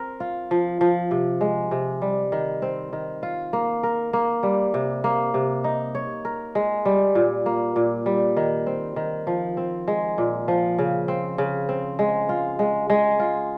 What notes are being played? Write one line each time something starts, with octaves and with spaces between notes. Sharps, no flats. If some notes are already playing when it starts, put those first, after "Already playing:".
Already playing: C4 A#4
F4
F3
F3
C3
G#3
C3
G3
D#3
C4
D#3
F4
A#3
A#4
A#3
G3
C3
A#3
C3
D#4
C#5
A#4
G#3
G3
A#2
A#3
A#2
G3
D#3
C4
D#3
F3
C4
G#3
A#2
F3
C#3
C4
C#3
C4
G#3
F4
G#3
G#3
F4